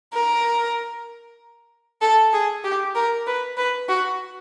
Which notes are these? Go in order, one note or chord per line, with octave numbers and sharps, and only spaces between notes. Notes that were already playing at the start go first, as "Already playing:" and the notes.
A#4
A4
G#4
G4
A#4
B4
B4
F#4